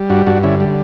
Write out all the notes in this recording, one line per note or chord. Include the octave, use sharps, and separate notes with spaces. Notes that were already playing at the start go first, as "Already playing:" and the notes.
Already playing: G3
G2 D4 F#4
G2 D4 F#4
D3 C#4 E4
G3